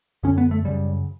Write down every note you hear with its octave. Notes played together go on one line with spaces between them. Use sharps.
F#2 D3 C#4
B3
A3
F#2 C#3 G3